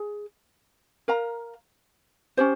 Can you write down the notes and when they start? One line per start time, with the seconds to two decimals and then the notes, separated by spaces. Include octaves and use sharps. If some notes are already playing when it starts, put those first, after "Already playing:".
Already playing: G#4
1.08 A#4 F5 A#5
2.37 C#4 G4 C5